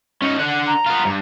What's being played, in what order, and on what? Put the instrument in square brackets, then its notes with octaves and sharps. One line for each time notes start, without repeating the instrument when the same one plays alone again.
[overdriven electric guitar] C#4 D#4
D4 F#5
[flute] A#5
[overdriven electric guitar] B3 F4
G2